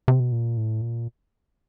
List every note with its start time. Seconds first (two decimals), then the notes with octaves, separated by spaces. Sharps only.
0.08 C3
0.20 B2
0.32 A#2
0.57 A2
0.81 A#2